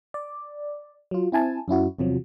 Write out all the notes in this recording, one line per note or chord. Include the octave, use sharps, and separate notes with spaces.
D5
F#3 F4
C4 E4 G#5 A5
F#2 C#4 E4 F#4
E2 C3 F3 F#3